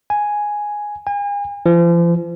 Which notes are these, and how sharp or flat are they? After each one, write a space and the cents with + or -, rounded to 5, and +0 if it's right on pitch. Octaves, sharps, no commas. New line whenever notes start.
G#5 +0
G#5 -40
F3 -40